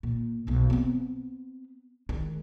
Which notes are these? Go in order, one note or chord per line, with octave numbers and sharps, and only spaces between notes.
A#2
B1 B2
B3 C4
D#3 G#3